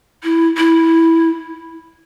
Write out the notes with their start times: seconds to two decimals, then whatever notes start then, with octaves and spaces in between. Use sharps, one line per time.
0.24 E4
0.57 E4